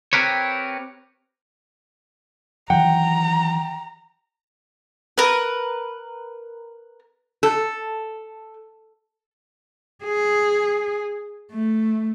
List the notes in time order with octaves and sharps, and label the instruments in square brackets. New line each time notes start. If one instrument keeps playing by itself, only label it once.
[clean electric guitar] C4 G4 A#4 B4 C#5
[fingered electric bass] D#3 E3 F#3 [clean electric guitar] F#5 [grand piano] G5 [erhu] A#5
[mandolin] A#4 B4
[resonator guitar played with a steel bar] A4
[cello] G#4
A3